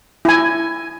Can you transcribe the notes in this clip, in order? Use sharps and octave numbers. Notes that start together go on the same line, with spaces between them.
E4 G#5